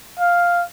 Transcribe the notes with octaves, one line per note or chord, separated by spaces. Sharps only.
F5